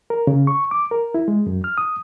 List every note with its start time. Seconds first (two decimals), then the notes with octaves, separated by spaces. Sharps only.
0.10 A#4
0.27 C#3
0.47 C#6
0.71 D6
0.91 A#4
1.14 E4
1.28 G#3
1.47 F#2
1.64 F6
1.78 D#6